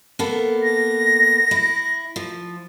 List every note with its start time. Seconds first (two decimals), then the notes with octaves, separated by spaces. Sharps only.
0.19 A#3 B3 A4
0.63 A#6
1.51 E4
2.16 F3